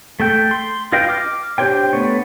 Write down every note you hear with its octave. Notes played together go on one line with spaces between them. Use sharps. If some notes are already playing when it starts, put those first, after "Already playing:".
A3 A4 G5
C6
F4 B4 D#5 F5 G5
D6 F6
D4 G4 C5 C#5 G5
A3 B3 C#5